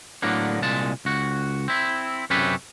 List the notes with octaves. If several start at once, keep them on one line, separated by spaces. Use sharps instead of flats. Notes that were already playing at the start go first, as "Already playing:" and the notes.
A2 D3 F#3 A#3 B3 D4
C2 A#2 G#3 A5
C#2 F#4
C4 E4
F#2 C3 C#4 G4 A4 B4